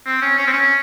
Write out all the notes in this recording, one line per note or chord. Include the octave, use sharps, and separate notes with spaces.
C4
C#4
C#4
C4
C#4